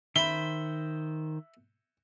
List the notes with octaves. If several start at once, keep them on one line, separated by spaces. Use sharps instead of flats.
D#3 C5 E5 B5 G7